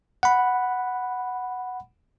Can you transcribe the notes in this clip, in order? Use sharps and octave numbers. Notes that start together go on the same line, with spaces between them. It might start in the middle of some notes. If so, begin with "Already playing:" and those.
F#5 B5